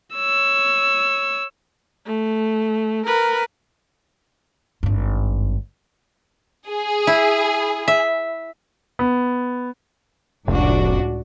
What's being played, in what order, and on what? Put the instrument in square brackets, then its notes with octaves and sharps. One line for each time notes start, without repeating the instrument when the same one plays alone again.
[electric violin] C#5 E6
[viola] A3
A#4 B4
[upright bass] G#1 G2
[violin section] G#4
[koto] E4
E5
[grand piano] B3
[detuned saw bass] F1 [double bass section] C#2 A2 [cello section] D4 F#4